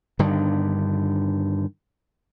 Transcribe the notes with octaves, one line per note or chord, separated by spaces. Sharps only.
G2 D3 D#3